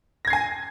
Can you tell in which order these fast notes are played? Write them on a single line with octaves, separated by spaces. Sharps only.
A#6 G#6 C7 G#5